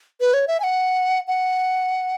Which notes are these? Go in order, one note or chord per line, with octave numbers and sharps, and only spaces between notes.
B4
C#5
E5
G#5
F#5
F#5